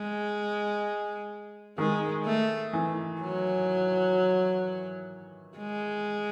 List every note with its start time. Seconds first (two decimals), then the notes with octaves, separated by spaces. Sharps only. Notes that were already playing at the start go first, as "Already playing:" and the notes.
Already playing: G#3
1.78 D#3 G#3
2.25 A3
2.73 E3
3.21 F#3
5.58 G#3